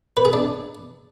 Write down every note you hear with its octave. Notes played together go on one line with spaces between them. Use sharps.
B4
G#4
D4